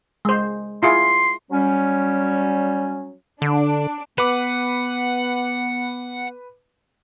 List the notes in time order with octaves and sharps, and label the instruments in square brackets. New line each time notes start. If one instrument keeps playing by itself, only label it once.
[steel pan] G#3 C5
[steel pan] E4 F4 G#4 [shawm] C6
[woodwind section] F#3 G3 C#4
[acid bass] D3 [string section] D4
[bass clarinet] B3 [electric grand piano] B4 D6 [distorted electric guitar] F#5